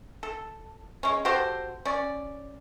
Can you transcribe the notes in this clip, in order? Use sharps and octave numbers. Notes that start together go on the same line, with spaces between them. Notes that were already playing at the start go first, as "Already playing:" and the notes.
A4
G#3 C#4
F#4 G4 A4 C5
C#4 D5